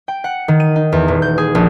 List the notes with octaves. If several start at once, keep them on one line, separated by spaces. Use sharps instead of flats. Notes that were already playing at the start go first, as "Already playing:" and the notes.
G5
F#5
D#3
D#7
D#4
E2
D#1
G6
G#4
A#1